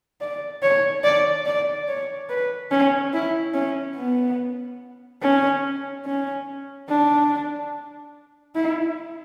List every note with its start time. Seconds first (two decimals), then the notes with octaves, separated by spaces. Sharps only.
0.21 D5
0.62 C#5
1.04 D5
1.46 D5
1.88 C#5
2.30 B4
2.71 C#4
3.13 E4
3.54 C#4
3.96 B3
5.22 C#4
6.05 C#4
6.88 D4
8.55 E4